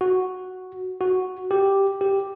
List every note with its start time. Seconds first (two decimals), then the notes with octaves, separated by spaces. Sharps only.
0.01 F#4
1.01 F#4
1.51 G4
2.01 G4